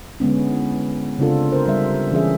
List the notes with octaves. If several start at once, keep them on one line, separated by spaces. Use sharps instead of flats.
D3 G#3 B3 C#4
E4
C#3 C4 D4 F4 A4
A#4 C5
G3 E5
E3 C#4 G#4 E5